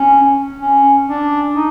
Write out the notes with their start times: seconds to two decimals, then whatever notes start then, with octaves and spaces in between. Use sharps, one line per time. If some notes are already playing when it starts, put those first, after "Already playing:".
Already playing: C#4
0.61 C#4
1.08 D4
1.55 D#4